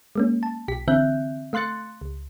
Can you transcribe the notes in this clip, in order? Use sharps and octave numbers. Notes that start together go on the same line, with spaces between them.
G#3 A#3 C#4
A5
B1 G4 B6
D3 E3 C4 E5 F#6 G6
A3 F5 C6 F#6 A6 C#7
C#2